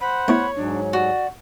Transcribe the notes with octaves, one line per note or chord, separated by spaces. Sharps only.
C5 F#5 B5
A3 B3 E4 C#5
G#2 F#3 D4
F#4 D5